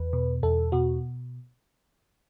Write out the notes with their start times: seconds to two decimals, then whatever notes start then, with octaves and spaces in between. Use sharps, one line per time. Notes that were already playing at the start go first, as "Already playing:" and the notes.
Already playing: E2 B4
0.13 B2
0.43 E2 A4
0.72 B2 F#4